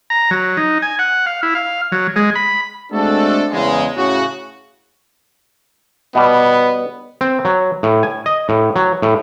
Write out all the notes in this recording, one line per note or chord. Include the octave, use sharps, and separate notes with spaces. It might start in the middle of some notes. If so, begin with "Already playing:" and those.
A#5
F#3
D#4
G#5
F#5
F5
E4
F5
F#3
G#3
B5
G#3 A3 C4 D4 F#4 A4
E2 C#3 G#3
A2 C#3 F#4
B2 G3 B3
C4
F#3
A2
G#5
D#5
A2
F#3
A2